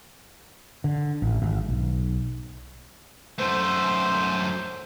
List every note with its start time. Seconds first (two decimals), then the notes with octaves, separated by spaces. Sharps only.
0.84 D3
1.22 A1
1.42 G#1
1.69 B1
3.38 F#2 A3 C5